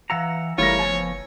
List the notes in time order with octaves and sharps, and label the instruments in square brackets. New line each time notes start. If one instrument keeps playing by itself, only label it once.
[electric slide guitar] E3 F#5 A#5 [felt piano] F5 E6
[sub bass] F#1 [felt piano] E3 G3 A3 [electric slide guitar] F4 A#4 [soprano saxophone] C#5
[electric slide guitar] F3 B3 [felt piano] G#5